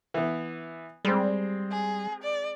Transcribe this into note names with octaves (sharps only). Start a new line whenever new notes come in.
E3 B3
G3 G#3 C4
G#4
D5